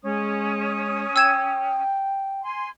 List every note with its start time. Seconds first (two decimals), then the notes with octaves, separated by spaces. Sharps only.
0.03 G#3 C#4 D#6
1.16 G5 E6 G#6 E7
2.41 G#5 C6